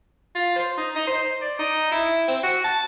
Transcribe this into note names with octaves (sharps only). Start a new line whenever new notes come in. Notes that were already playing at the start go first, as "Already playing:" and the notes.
F4
C5
D#4
D#4
C5
D5
D#4
E4
C4
F#4
A5